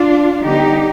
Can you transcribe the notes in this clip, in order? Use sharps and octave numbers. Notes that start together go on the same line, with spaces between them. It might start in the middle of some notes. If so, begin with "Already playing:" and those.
Already playing: D4 F4
D3 G3 B3 D#4 G4